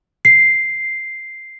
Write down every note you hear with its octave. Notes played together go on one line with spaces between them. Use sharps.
C7